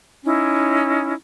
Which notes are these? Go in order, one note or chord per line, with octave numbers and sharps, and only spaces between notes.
C#4 D#4 E4